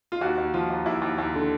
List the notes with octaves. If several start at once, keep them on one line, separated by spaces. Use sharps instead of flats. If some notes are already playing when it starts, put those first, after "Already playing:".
F4
D#2 F#4
D#2
F3 F4
D#2
D#2 E4
D#2
D#2
D3